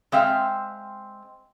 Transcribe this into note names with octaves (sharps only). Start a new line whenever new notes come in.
G#3 C4 E5 F5